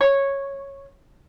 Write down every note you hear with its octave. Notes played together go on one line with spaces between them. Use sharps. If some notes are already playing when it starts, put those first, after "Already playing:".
C#5